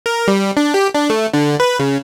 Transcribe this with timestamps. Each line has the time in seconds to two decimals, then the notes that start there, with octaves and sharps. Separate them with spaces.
0.06 A#4
0.28 G3
0.57 D4
0.74 G4
0.95 D4
1.10 A3
1.33 D3
1.60 B4
1.79 C#3